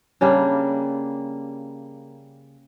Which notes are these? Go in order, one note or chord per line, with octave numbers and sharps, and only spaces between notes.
C#3 G3 A#3 D4